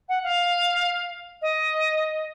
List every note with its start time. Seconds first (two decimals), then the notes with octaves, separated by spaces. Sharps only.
0.09 F#5
0.23 F5
1.42 D#5